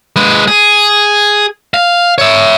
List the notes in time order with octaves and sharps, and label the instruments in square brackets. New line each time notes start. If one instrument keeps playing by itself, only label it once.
[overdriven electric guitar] G#3 B4
G#4
F5
C#5 E5